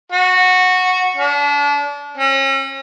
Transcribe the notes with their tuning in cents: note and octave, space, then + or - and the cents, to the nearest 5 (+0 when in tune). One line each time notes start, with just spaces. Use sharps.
F#4 -10
D4 -30
C#4 -40